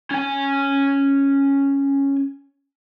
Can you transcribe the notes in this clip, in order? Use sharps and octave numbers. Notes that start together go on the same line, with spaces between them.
C#4 G#5